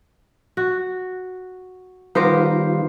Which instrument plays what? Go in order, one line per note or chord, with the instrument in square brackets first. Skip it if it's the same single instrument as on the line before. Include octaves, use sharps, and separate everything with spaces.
[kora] F#4
[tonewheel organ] D#3 G3 F4 [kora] B3 G4 A#4 [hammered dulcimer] C5